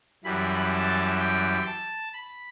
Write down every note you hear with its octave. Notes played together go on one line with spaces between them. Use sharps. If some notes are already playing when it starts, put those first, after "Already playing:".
F#2 E3 G3 B5
A5
G5
A5
B5